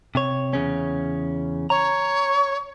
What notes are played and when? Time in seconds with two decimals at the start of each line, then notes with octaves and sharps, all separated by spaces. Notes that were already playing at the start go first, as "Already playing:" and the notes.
0.15 C3 C#5
0.53 E2 C#3 C#4
1.70 C#5 A#5